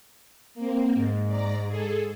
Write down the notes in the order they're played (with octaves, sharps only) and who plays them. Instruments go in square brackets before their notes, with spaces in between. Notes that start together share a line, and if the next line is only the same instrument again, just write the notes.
[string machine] A#3 C4
[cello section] G#2
[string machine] D5 A#5
G#4 A4